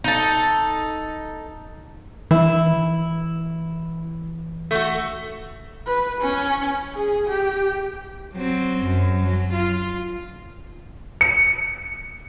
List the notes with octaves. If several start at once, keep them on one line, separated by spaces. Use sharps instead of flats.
D#4 A4
E3 E4
A3 F#4
B4
C#4
G#4
G4
F#3 C4
F#2
F#3
F4
C#7